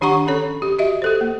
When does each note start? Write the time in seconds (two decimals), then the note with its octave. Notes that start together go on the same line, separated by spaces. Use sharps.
0.01 D#3 D4 G4 F#5 A#5 C#6
0.27 C#4 A4 C#5
0.62 G4
0.78 F#4 G4 D#5 E5
1.02 G4 A4 C5
1.21 A#3